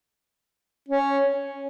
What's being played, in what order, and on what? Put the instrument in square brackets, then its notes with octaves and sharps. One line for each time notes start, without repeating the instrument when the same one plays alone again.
[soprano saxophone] C#4